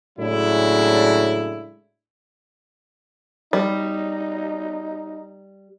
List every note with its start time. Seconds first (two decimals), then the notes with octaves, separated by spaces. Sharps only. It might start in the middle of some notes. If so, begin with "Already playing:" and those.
0.19 A2 C#3 F#3 G#3 D4 E4
3.53 G3 D#4